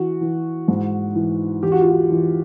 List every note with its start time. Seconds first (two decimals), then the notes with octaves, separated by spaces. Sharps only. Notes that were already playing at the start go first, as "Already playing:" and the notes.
Already playing: E3 F#4
0.21 E3
0.68 G#2
1.15 E3
1.63 E2 G4
1.72 F#4
1.81 F4
1.89 F#4
2.10 E3